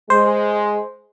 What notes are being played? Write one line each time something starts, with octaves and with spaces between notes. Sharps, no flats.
G#3 C5